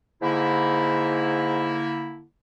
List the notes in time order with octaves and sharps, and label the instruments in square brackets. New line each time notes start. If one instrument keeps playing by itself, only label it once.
[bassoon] G#2 [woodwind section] D3 A#3 E4